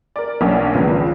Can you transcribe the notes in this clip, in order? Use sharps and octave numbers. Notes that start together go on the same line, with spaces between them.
A#4 D5
B1 A#3 C#4 D4
G#1 C#2 F3 B3